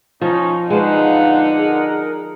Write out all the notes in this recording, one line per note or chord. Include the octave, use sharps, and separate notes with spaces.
F3 C#4 D#4
D3 G#3 D#4 B4 C5 F5 F#5
G#4 A#4